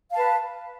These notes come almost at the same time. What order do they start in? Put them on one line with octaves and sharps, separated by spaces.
F5 A5 B4